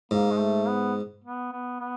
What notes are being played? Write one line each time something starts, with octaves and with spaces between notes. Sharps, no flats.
G#2 A#3
G#3
A3
B3
B3
B3
B3